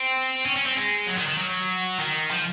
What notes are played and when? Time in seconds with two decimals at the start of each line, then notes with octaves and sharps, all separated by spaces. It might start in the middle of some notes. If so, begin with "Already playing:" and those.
Already playing: C4
0.46 C#4
0.56 C#4
0.66 C4
0.77 G#3
1.07 F#3
1.18 D#3
1.28 D#3
1.38 F#3
2.00 D#3
2.31 F3